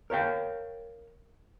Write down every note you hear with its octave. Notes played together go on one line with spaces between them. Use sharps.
A#4 C#5 F5 G5